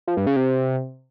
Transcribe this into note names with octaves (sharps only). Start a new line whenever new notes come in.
F3
G2
C#3
C3